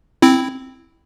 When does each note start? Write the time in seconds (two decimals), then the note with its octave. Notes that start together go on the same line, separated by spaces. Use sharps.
0.22 C4 E4